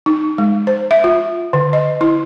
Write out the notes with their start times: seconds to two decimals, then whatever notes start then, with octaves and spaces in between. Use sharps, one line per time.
0.06 D#4
0.38 G#3
0.67 C5
0.91 E5
1.04 F4
1.53 D3
1.73 D#5
2.01 E4